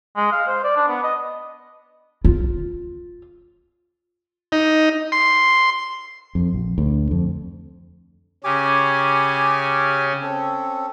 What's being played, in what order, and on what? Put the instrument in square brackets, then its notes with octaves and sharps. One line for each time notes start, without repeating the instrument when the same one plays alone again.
[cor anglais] G#3
F5
C5
D5
D4
B3
D#5
[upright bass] F4
[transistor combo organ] D#4
C6
[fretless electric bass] F2
A#1
D2
F2
[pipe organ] C#3 C#4 [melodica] G4 G#5 D6
[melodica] C4 C#4 A4